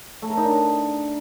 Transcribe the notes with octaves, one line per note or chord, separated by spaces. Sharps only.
A3
A#4
D#4
D4